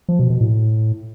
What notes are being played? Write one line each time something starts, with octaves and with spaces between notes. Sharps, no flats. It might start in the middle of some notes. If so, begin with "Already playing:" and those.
F3
B2
B2
A2